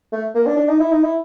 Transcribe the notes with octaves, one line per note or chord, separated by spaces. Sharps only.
A3
A#3
D4
D4
D#4
E4
D#4
E4